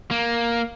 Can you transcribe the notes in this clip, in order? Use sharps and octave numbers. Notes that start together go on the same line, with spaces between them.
A#3